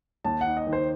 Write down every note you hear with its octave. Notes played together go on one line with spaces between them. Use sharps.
D#2 A5
D#4 F#5
D#5
D#3
C5